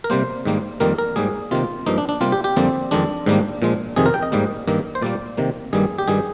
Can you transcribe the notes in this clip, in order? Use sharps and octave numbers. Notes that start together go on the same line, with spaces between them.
A#4
C3 G3 A#3 C5
G#2 D#3 G3 A#3
F2 D#3 G3 A#3 A#4
A#4
G#2 G3 A#3 G#4
C3 D#3 A#3 F4
G2 F3 A#3 D#4
D4
D4
C3 G3 A#3 F4
G4
G4
F2 D3 G3 A#3 C4
F2 D#3 G#3 D4
G#2 D#3 G3 A#3
A#2 F3 G#3
F2 C3 D#3 G#4
A#4
G5
D#5
G#2 G3 A#3
G2 D#3 A#3
C5
A#2 G3 A#3 D5
C3 D#3 A#3
G2 D#3 G3 A#3 G#4
G4
G2 D#3 G3 G#4